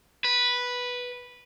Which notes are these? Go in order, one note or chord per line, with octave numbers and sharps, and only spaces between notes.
B4